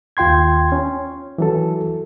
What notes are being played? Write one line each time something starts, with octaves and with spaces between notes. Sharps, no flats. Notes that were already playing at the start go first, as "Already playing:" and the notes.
D#2 F4 G5 C6 G#6
C#4
E3 F#3 A4